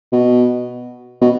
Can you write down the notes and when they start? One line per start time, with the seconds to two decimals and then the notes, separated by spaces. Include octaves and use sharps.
0.12 B2
1.21 B2